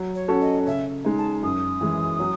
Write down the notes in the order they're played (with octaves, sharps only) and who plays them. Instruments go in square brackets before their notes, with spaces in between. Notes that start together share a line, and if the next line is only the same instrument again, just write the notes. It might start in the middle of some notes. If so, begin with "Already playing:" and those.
Already playing: [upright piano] F#3
[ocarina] C#5
[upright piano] C#4 F#4 A4
[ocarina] D#5
[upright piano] C#3 [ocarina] E5
[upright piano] G#3 D#4
[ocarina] A5
[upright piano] F#2 [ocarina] D#6
[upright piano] E3 G#3
F#3